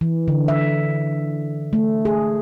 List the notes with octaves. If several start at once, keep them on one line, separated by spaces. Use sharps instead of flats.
E3
D3
E5
A3
G#4